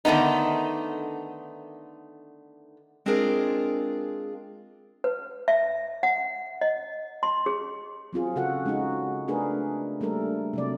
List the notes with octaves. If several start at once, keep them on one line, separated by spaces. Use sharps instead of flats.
D3 D#3 A3 B3 D#4
G#3 C4 D4 F4 G#4 A#4
B4
E5
F#5
D#5
C6
G#4
F#3 C4 F4 G#4
C#3 F#4 A4 F#5
G#3 C#4 D#4 F#4
A3 D4 G#4 A#4 B4
G3 A3 A#3 D4 A4 A#4
C3 F#3 D5